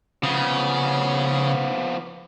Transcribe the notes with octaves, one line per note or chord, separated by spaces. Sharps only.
C#3 F3 B3